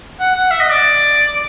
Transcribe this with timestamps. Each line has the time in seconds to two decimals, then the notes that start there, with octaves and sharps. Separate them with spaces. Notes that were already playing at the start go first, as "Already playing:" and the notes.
0.20 F#5
0.35 F#5
0.50 E5
0.60 D#5
0.71 D5